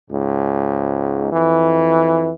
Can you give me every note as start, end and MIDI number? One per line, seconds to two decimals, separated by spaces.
0.10 1.29 37
0.10 1.29 44
1.32 2.31 41
1.32 2.31 52